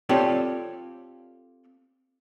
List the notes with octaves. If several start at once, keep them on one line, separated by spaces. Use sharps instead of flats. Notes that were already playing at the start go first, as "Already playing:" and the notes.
C4 F4 G4 A4 C#5 D5